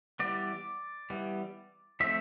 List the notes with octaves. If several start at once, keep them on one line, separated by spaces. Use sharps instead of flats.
E3 G3 B3 D5
E3 G3 B3
F3 A3 C4 E5